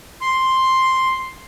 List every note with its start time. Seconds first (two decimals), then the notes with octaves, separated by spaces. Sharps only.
0.21 C6